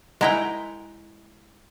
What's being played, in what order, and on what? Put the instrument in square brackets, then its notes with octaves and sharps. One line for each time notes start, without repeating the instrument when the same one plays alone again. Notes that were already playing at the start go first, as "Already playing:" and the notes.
[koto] G#3 E4 G5 [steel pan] D#5 F#5 A#5